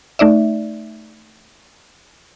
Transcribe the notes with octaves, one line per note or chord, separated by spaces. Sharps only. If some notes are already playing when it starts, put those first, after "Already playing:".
A3 D#4 D5 E5